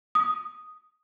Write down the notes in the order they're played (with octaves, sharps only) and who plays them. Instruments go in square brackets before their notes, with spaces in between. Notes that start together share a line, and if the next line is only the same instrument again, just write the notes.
[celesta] D#6